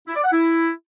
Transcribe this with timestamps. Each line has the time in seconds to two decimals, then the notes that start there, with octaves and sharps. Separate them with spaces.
0.07 E4
0.16 D5
0.24 F#5
0.32 E4